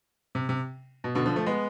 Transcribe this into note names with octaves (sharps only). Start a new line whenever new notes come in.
C3
C3
B2
B2 D3
D3 F3
F3 A3
G#3 B3